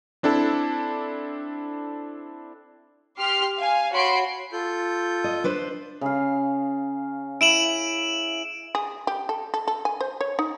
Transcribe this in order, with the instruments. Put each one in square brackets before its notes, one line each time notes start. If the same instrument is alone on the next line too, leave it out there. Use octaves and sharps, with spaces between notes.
[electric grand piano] C4 D4 E4 A4 A5
[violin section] G4 C6 F6
F5 G#5
F#4 C#5 B5 C6 C7 D7
[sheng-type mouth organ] F4 A4 G6
[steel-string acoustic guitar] D#5
D4 B4 C5
[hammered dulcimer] C#3 F5
[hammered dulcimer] E4 [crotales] D7 E7 F#7
[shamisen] G#4
G4
A4
A4
A4
G#5
C5
C#5
D#4